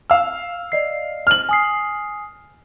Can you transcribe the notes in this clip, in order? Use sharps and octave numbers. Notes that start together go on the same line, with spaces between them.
F5 E6
D5 D#5 C7
F6 F#7
G#5 D#6 C7